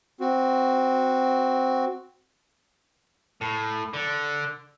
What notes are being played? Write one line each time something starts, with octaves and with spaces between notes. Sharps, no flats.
C4 F#4
A2
D3